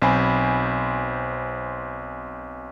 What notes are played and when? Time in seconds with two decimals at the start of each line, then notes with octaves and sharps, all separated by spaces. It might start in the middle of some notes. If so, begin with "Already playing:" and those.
0.02 B1 C4 C5 G#5 B5